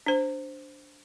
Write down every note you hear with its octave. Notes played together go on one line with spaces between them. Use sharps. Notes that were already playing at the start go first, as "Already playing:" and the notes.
D4 C5